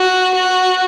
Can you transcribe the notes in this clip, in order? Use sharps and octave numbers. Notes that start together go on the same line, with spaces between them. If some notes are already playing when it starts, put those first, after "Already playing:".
Already playing: F#4
F#4